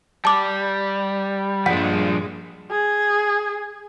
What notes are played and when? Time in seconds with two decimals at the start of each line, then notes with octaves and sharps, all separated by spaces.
0.25 G3 A5 D6
1.66 G2 A#2 F3 G#3 D4 F#5
2.71 G#4